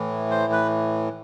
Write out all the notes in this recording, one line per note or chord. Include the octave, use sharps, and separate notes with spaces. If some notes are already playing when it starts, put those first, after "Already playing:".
Already playing: A2 E3
C5
B4